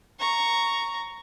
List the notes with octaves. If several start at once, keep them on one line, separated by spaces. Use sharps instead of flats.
A#5 C#6